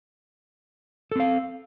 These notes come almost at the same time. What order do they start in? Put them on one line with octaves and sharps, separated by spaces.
A4 C4 F5